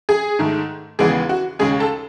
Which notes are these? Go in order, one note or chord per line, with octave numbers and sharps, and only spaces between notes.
G#4
G#2 D#3 A3
D#2 C#3 E3 G#3 B3 G#4
F#4
D#2 C#3 G#3 C#4 G#4
A4